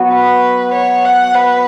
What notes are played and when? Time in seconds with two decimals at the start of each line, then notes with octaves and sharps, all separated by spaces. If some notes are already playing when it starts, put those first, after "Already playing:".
Already playing: F#3 B3 F#4
0.12 B4
0.74 C#5
1.05 F#5
1.36 B4